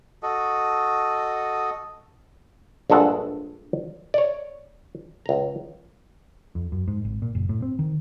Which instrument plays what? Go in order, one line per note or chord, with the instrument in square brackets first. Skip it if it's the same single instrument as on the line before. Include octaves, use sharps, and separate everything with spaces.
[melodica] F#4 A4 D#5
[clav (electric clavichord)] A#1 G2 G#3 A4 F#5
C#5 D5
C#2 A#5
[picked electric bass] F2
F#2
G#2
G#1
A#2
F#1
A2
C4
D#3